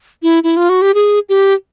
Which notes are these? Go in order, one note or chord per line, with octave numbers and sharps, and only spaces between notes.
E4
E4
F4
F#4
G4
G#4
G4